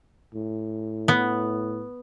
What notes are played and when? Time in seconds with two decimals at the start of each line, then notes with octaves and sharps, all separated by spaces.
0.34 A2
1.08 B3